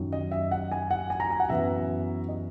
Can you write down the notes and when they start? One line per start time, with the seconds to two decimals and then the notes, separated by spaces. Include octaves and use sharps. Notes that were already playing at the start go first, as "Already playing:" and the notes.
Already playing: F#2 D#3 F#3
0.12 D#5
0.31 E5
0.51 F#5
0.72 G#5
0.91 F#5
1.10 G#5
1.20 A#5
1.30 G#5
1.40 F#5
1.50 F#2 E3 B3 E5
2.28 D#5